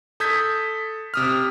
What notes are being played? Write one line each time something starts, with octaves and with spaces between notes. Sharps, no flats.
A4 D#6 G6 G#6 B6
C3 D#6 F6